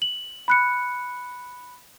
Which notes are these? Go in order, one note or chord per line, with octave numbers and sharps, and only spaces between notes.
F#7
B5 F#6 C#7